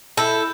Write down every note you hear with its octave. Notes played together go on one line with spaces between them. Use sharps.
E4 A4 B5 E6 G6 E7